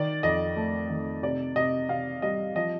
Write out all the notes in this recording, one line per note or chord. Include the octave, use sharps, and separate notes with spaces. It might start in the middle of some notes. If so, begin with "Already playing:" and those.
Already playing: D#3 D5
F2 D#5
A3
D#3
C3 D5
C3 D#5
C3 F5
G3 D#5
F3 D#5